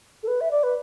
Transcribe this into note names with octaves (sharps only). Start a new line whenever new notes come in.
A4
B4
E5
D5
B4